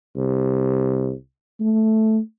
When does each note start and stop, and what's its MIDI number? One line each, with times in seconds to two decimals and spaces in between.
0.16 1.12 36
1.60 2.19 57